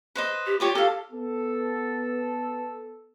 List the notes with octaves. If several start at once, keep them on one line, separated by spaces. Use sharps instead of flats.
B4 C5 D#5
G4
F4 G4 C#5 D5
G4 A4 F5
B3 A4